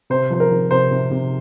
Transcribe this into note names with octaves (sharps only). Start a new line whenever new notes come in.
C3 C5
F3 C5
A#4
F3
C3 C5
C3
C3